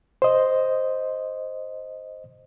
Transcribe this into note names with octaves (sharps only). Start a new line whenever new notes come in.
C5 D#5